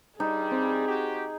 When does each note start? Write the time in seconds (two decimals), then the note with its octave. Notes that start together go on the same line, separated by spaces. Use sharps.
0.20 G2 G3 D#4 G#4
0.52 C4
0.88 F#4 G4